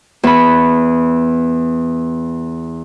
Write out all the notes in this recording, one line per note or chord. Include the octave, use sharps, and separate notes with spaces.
E2 B5